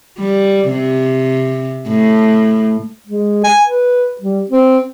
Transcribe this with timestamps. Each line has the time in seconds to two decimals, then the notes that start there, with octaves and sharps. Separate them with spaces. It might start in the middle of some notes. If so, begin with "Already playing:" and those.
0.18 G3
0.69 C3
1.88 A2
3.07 G#3
3.44 G#5
3.65 B4
4.21 G3
4.51 C4